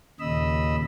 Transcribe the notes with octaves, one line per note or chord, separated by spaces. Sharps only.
D#2 A#2 C#3 D#5 B5 E6